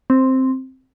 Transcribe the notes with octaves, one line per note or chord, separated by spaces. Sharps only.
C4